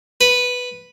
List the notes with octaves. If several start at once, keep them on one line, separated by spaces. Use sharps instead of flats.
B4